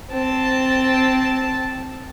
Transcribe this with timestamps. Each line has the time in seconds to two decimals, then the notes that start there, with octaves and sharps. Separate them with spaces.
0.11 C4 A5